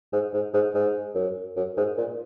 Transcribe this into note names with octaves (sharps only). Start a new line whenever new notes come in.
G#2
G#2
G#2
G#2
F#2
F#2
G#2
A#2